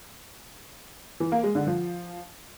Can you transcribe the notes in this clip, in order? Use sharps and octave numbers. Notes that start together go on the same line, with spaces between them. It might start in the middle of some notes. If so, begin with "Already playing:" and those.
E3
A#3
G#3
D3
F3